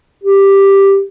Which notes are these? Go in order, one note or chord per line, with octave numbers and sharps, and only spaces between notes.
G4